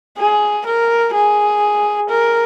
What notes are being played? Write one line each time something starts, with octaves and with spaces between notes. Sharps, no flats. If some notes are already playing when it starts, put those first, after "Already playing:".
G#4
A#4
G#4
A#4